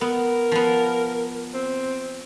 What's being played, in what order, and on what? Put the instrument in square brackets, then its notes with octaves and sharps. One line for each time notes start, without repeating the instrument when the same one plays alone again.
[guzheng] B3 [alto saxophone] A#4
[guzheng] F3 B3
[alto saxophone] C4